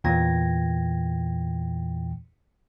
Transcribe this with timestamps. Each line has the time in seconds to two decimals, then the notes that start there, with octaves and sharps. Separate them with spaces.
0.04 E2 A#2 E3 G5 G#6 A#6